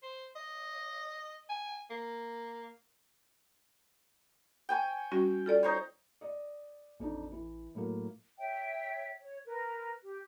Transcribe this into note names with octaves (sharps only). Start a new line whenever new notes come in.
C5
D#5
G#5
A#3
G5 G#5 C#6
G3 C#4 F#4
F4 A4 D5
D#4 C5 C#5
D5 D#5
A1 F2 D4 D#4
E3
A2 F#3 A#3
C#5 E5 G5
C#5
A#4 B4
G4